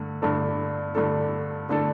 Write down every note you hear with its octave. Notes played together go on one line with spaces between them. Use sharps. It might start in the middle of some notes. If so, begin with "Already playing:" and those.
Already playing: G2 D3 A3
G2 D3 A3 D4 A4
G2 D3 A3 D4 A4
D3 A3 D4 A4